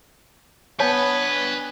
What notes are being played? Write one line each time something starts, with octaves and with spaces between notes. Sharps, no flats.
B3 D4 B4 C#5 G#5 A5